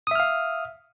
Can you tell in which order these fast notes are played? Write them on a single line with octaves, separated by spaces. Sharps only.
D#6 E5 F6 F5